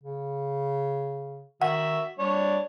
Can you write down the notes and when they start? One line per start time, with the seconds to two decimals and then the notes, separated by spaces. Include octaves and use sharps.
0.04 C#3
1.62 D#3 F#4 E5 F#5
2.19 G3 D4 C#5